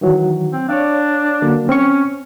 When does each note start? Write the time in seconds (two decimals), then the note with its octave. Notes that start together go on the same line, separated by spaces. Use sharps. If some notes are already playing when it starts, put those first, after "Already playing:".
0.01 D#3 E3 F#3
0.53 C4
0.69 D4 C#5 D5 F5
1.42 D3 F#3 A#3
1.69 C4 C#4 C#6